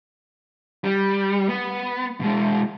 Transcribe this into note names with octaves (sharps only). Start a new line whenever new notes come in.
G3
B3
B2 G#3